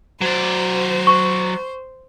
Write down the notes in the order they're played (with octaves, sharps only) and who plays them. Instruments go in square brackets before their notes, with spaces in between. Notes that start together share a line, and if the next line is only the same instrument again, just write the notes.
[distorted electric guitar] F#3 D5 [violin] C5
[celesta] C#6